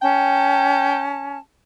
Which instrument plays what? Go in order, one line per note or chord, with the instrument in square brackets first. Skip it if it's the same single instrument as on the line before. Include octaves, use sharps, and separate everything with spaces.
[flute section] C#4 A5 [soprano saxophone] G5